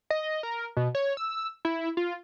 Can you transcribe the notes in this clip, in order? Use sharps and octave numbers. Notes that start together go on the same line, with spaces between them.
D#5
A#4
B2
C#5
E6
E4
F4